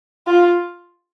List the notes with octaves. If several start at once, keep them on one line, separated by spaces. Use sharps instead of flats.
F4